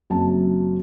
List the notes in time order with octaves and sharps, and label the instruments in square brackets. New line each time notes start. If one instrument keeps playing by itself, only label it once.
[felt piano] F#1 F#2 F#3 C4 A5